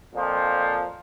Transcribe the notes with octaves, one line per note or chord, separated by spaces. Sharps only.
F2 A#2 F3